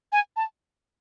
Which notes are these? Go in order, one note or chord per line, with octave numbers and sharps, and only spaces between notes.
G#5
A5